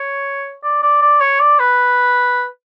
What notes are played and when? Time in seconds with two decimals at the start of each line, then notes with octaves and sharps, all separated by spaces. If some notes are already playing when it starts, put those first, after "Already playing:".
Already playing: C#5
0.63 D5
0.82 D5
1.02 D5
1.21 C#5
1.40 D5
1.59 B4